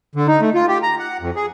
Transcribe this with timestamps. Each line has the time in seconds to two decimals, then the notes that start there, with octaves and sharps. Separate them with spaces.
0.15 D3
0.27 D#4
0.41 A3
0.54 F4
0.68 G4
0.83 A#5
0.99 F#5
1.21 F2
1.36 G#4